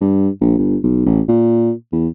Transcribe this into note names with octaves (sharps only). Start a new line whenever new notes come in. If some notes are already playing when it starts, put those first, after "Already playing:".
G2
A#1
G1
B1
A1
A#2
E2